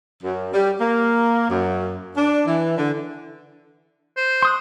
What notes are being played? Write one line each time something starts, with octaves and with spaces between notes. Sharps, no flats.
F#2
G3
A#3
F#2
D4
E3
D3
C5
C6 D#6 F#6